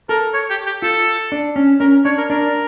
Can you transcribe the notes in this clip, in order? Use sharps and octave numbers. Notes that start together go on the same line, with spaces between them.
A4 A#4
C#5
G4
G4
F4 A4
D4
C#4
C#4 A#4
D4 C#5
A#4
D4 A#4